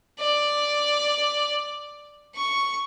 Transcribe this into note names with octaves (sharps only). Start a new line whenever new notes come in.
D5
C#6